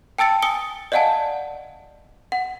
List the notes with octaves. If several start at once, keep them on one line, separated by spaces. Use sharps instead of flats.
G5 A5 E6 A6 C#7
G#5 D#6 C#7 G7
D5 D#5 F5 F#5 G#5 A5
F#5